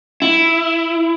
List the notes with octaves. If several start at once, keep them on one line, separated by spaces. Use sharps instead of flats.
E4